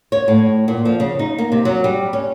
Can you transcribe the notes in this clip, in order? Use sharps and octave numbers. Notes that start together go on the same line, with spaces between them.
C#5
A2
A#2
F3
C#3
D#4
A#3
C3
F#3
G3
C#4